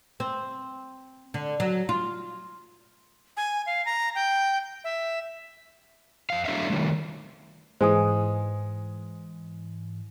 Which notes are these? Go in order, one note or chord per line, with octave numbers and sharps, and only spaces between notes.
C4
D3
F#3
F4
G#5
F5
A#5
G5
E5
F2 F5
F#3 A3 D4 D5 E5 F5
D#3 F3 G3 A3
G#2 E3 G#3 C5 G#5 D#6